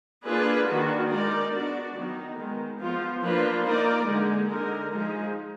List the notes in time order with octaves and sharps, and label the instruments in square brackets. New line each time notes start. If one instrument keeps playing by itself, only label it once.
[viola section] A#3 D4 F4 G#4 B4
D#3 A#3 D4 F#4
G#3 D#4 A#4 D5
B3 D4 F#4 D5
D#3 F#3 B3 D#4
D#3 G#3 B3
F3 B3 F4
F3 A#3 D4 F4 B4
A#3 D#4 A#4 D5
D3 G#3 D#4
D3 G#3 D#4 A#4
F3 G#3 D#4 G#4